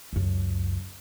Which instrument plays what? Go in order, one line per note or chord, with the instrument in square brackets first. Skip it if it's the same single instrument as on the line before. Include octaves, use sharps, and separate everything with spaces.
[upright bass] C#2 F#2